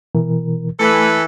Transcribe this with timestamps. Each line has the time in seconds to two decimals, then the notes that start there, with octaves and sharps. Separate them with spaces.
0.15 B2 E3 A#4
0.80 E3 A3 A4 B4